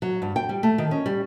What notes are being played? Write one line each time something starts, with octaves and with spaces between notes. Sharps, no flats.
F#3
G2
G5
G3
A3
D#3
C#4
G3